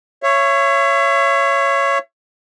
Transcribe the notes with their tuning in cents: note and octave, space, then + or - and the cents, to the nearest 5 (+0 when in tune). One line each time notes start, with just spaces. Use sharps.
C#5 +0 E5 +35